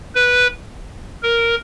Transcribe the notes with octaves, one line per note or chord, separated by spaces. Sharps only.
B4
A#4